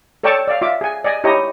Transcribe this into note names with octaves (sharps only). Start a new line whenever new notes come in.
A4 C#5 D5 G5 A5 C#6
D5 F5
F4 E5 D6
G#4 G#5
D5 D#5 G#5
D#4 E4 G4 C#5 D#5